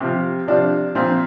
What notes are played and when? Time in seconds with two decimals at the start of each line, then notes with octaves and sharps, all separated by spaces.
0.01 C3 F3 G4
0.48 C3 F3 D4
0.95 A#2 F3 C4